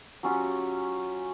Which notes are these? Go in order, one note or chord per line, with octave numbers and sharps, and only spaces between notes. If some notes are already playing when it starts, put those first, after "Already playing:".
F#3 C#4 F4 G4